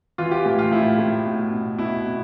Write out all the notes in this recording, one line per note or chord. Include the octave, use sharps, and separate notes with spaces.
E3 F4
G4
A2 G4
F4
A2 E4
A2
B2
B2
B2 E4
B2